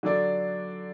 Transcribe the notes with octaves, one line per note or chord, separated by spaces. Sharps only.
D3 F#3 D4 A4 D5